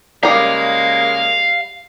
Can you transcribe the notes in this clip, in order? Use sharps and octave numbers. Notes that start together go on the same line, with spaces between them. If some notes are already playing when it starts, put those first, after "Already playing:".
C#3 G3 G#3 A#3 D#4 F5